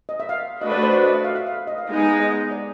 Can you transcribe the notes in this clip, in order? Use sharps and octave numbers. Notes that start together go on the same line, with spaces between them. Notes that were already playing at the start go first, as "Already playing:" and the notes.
D#5
E5
F5
A3 D4 F#4 B4 D#5
D5
C5
D5
D#5
E5
F5
E5
F5
D#5
F5
G#3 B3 D#4 G#4
D#5
D5